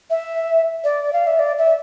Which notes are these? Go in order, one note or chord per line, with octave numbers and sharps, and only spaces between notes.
E5
D5
F5
E5
D5
E5